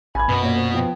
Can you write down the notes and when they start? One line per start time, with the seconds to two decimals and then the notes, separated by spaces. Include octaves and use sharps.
0.15 A1 G#5 B5 G#6
0.29 F#2 B2 F#4 B4
0.43 A#2 C#5
0.55 C5
0.74 F3 B3 G5